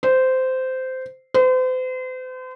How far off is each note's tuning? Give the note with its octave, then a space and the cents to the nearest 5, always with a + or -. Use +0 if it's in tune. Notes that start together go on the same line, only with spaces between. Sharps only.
C5 -15
C5 -40